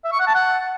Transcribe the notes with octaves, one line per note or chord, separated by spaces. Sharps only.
E5
C#6
F#5
A5
F#5